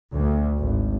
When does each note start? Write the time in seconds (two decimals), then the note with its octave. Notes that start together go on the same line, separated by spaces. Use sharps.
0.15 D2
0.60 G#1